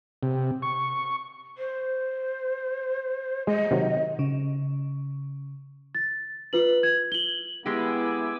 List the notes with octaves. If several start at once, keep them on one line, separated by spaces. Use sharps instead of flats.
C3
C#6
C5
G#3 D#5
C3 D#3 F#3
C#3
A6
F4 B4 F#7
G#6
F#7 G7
G#3 B3 E4 G4 G#5 D6 E6